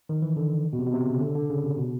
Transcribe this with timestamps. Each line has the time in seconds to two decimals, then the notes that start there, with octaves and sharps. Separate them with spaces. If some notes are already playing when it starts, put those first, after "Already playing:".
0.09 D#3
0.22 E3
0.36 D3
0.73 B2
0.79 C3
0.87 B2
0.94 C3
1.07 C#3
1.21 D3
1.35 D3
1.50 C#3
1.64 C3
1.77 B2